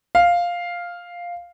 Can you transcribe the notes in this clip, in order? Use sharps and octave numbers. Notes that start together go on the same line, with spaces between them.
F5